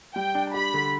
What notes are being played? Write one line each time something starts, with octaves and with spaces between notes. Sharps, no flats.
G3 G5
D4
G4 B5
D3